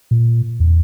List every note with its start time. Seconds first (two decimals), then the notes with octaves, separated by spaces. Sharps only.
0.11 A#2
0.60 E2